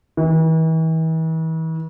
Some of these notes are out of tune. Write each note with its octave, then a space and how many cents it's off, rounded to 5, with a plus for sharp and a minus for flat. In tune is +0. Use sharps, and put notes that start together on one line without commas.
E3 -40